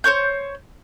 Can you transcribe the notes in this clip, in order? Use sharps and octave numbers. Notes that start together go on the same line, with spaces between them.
C5 C#5 C#6 G6